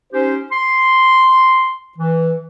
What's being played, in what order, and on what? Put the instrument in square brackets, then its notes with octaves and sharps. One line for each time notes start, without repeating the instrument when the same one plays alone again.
[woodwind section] C#4 D#4 G4 C5
C6
E3